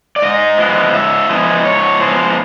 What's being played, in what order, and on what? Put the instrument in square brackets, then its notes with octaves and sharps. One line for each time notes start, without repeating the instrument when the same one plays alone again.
[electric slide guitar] D5
G#2 D#5
F3 G#3 B3 E4
G#2 E5
F3 G#3 B3 E4 D#5
G#2 C#5
F3 G#3 B3 E4 C5